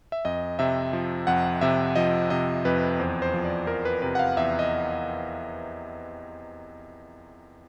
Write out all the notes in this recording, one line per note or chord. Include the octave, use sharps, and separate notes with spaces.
E5
F2 D#5
C3 E5
F3
F2 F#5
C3 E5
F3 D#5
C3 D#5
F2 B4
E2 C5
C5
F3
D5
F3 A#4
B4
C3 B4
F#5
F5
E2 E5
D#5